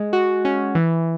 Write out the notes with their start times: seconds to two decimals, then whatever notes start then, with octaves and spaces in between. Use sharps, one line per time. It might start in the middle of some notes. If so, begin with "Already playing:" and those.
Already playing: G#3
0.13 F#4
0.45 C#4
0.75 E3